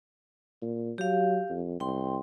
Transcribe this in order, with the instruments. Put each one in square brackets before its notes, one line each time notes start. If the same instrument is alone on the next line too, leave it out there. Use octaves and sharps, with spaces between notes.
[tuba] A#2
[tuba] F#3 [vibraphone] G4 F5
[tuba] F2
[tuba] C2 [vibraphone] G5 C6